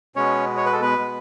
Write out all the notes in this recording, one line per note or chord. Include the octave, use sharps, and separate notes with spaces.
B2 G#3 B3 C#4 C#5
C#5
B4
A4
B3 B4
B2 G#3